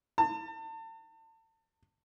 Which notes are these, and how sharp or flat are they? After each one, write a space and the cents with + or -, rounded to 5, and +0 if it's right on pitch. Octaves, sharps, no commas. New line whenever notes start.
A5 +35